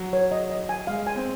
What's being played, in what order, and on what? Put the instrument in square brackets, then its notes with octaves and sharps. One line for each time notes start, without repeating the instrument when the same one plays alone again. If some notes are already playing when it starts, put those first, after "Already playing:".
Already playing: [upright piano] F#3
[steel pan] C#5
D#5
D#5
G#5
[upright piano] G#3 [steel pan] F5
[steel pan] G#5
[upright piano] C4